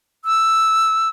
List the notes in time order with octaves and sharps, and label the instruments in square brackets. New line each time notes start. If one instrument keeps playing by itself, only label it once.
[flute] E6